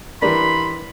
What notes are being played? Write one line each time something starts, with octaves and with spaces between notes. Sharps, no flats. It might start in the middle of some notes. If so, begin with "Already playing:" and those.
E3 G3 D4 A#4 B5 C6